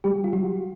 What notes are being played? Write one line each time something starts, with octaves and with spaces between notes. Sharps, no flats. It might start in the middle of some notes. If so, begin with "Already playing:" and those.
G3 G4
F4
F#3 F#4